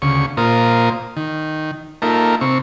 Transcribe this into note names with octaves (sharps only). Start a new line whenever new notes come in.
D2 C#3 C#6
A#2 F4 A#4 C5 D#6
D#3
A#3 D#4 F4 A4 A#4 E5
C3 C4 C#6